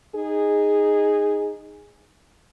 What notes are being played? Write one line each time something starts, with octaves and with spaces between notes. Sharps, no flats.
D#4 G#4